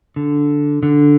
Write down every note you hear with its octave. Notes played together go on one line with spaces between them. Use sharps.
D3
D3